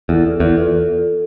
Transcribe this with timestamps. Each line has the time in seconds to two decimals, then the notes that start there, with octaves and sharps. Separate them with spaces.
0.08 E2 F4 A4 D5
0.40 E2
0.57 F4 A4 D5